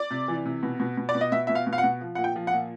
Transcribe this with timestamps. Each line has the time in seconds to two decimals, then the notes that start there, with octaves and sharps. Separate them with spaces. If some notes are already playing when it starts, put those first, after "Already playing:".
Already playing: D5
0.11 C3
0.28 E3
0.45 C3
0.63 B2
0.80 B2
0.97 B2
1.09 D5
1.15 B2
1.21 D#5
1.32 B2 E5
1.47 B2 E5
1.55 F5
1.67 B2
1.73 F5
1.78 F#5
1.84 B2
2.01 F3
2.15 A#2 F#5
2.24 G5
2.36 F3
2.47 F#5
2.53 A#2